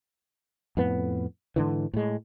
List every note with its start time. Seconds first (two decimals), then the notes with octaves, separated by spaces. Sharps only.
0.77 F2 A2 B3
1.56 G#2 D3 E3
1.93 A2 G#3